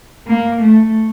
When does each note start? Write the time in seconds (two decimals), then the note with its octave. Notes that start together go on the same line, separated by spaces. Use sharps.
0.27 A#3
0.62 A3